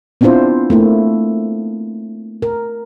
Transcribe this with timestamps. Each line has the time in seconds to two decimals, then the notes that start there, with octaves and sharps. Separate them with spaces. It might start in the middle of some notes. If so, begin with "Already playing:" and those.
0.21 B3 C4 D4 E4 F4 C5
0.70 A3 A#3 E4
2.42 A#4